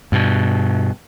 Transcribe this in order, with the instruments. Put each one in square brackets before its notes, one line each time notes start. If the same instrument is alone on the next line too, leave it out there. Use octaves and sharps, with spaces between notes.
[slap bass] G2 B2